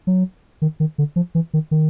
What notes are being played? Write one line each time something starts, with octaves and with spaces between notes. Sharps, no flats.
F#3
D#3
D#3
D3
F3
E3
D#3
D#3